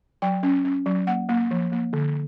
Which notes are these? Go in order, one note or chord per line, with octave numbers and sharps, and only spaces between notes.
F#3 G5
C#4
C#4
F#3
A#3 F#5
A#3
F3
A#3
D3